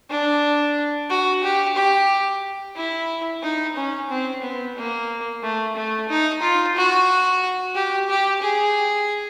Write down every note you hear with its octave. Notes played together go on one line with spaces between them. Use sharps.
D4
F#4
G4
G4
E4
D#4
C#4
C4
B3
A#3
A3
A3
D#4
F4
F#4
G4
G4
G#4